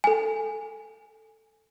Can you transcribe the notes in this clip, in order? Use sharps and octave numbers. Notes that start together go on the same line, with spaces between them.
A4 G#5